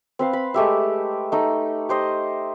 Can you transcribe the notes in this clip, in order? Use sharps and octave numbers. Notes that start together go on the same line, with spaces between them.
C4 B4 F5
B5
G#3 A3 G4 E5
A3 D#4
G4 C5 D#5